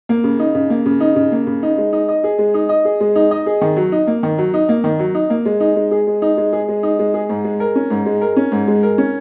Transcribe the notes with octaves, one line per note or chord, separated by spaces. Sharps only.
A#3
C#3
D#4
C#3
A#3
C#3
D#4
C#3
A#3
C#3
D#4
G#3
D#4
D#5
G#4
G#3
D#4
D#5
G#4
G#3
D#4
D#5
G#4
D#3
F#3
D#4
A#3
D#3
F#3
D#4
A#3
D#3
F#3
D#4
A#3
G#3
D#4
G#3
G#4
G#3
D#4
G#3
G#4
G#3
D#4
G#3
G#4
G#2
G#3
A#4
C#4
G#2
G#3
A#4
C#4
G#2
G#3
A#4
C#4